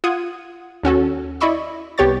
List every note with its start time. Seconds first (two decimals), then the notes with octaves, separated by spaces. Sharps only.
0.04 F4 F#5 D#6 G#6 D#7
0.83 D#2 C#4 F#4 A4
1.41 E4 D5 D#5 B5 C#6 E6
1.98 C2 B3 G4 C#5 C#6 A6